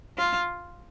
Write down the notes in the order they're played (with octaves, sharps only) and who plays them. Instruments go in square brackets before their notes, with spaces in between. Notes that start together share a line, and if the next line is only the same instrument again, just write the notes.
[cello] F4